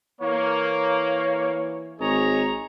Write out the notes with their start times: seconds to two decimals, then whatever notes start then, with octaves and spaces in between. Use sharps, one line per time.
0.21 E3 A#3 C#5
2.00 G#1 G#4 C#5 D#5 A#5